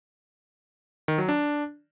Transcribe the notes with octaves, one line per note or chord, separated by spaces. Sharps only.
D#3
F#3
D4